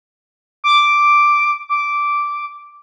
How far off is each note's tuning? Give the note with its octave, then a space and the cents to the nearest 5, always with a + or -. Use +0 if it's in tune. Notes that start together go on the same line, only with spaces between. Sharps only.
D6 +0
D6 -5